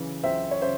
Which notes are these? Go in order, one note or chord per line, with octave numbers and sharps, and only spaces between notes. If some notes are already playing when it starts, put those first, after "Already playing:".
Already playing: C#3 E3
C#2 C5 E5
C#5
C#3 C5 E5